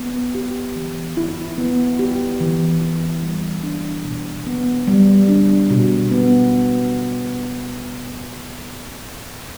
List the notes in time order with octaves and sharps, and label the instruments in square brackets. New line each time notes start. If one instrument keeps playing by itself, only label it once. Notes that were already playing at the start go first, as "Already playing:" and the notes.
Already playing: [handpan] B3
G4
E3
E4
B3
G4
E3
E4
G3
D4
B2
B3
G3
D4
B2
B3